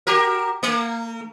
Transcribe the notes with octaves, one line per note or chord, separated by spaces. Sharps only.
F#4 G4 A#4
A3